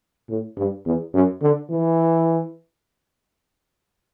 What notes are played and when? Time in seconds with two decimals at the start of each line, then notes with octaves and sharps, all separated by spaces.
0.29 A2
0.57 G2
0.86 E2
1.14 F#2
1.42 D3
1.70 E3